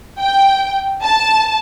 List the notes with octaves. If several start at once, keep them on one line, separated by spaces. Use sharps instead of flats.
G5
A5